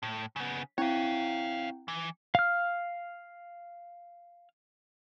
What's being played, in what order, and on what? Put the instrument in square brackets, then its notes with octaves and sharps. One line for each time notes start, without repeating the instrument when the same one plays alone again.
[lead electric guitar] A2
C#3 B3
[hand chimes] C4 E4 G5 [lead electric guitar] C#5 F5
[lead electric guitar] E3
[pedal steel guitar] F5 F6